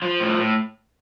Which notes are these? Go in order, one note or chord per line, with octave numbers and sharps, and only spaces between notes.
F3
A2
A2